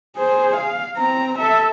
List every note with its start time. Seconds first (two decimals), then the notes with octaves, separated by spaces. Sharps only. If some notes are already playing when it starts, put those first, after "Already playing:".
0.17 G#4 C5
0.56 F5
0.97 C4 A#5
1.39 A4 E5